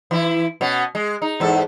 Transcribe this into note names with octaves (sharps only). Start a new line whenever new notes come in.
E3 E4
B2 C#4
G#3
D#4
E2 G#2 A4